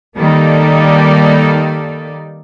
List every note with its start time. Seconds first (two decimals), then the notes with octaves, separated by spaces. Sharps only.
0.16 D#3 G3 A#3 D#4 A4 D5